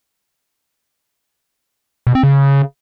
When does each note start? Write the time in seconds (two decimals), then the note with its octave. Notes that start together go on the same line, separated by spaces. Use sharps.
2.07 B2
2.15 C4
2.23 C#3